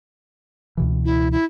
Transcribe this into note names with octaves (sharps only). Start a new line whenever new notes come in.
C#2 B2 E3
E4
E4